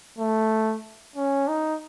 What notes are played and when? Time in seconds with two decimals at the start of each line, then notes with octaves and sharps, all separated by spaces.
0.18 A3
1.16 C#4
1.48 D#4